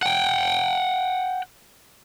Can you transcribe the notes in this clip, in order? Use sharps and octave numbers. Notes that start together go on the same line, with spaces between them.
F#5 G5